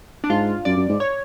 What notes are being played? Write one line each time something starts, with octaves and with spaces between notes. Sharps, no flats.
D4
G#2 F4
F#2 D5
F#2
G#2
C#5